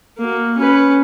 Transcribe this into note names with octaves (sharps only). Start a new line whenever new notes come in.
A#3 F#4
C#4 B4